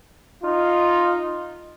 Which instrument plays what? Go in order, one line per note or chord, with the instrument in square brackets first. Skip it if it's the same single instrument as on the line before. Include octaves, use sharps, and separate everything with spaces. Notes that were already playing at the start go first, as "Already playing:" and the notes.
[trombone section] D#4 F4